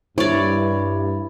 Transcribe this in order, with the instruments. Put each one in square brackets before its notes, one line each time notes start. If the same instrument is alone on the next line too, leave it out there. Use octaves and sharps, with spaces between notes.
[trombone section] G2 [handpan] E4 [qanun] C#5 D5